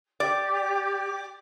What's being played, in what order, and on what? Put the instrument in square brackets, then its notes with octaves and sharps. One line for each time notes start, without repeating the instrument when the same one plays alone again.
[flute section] G4 [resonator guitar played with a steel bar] D5